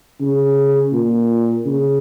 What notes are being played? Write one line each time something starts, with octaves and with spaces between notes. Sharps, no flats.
C#3
A#2
C#3